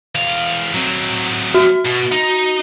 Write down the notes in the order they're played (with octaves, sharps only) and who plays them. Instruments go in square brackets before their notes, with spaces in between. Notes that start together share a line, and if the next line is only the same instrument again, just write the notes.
[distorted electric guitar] E2 F5
F#3 C4
[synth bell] F#4
[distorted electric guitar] B2
D#4